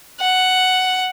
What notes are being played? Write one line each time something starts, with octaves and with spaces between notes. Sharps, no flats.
F#5